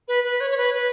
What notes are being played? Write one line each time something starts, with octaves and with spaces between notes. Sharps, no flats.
B4
B4
C#5
C#5
B4
B4